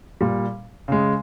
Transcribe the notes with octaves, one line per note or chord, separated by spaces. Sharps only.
A#2 G3
C#3 G#3